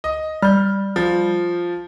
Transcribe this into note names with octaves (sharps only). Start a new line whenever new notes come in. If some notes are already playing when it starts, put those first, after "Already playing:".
D#5
G3 F6 G6
F3